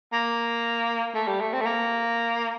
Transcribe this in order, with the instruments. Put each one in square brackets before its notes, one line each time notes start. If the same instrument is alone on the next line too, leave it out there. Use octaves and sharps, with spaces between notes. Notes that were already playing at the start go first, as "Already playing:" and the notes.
[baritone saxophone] A#3
A3
G3
A3
C4
A3
A#3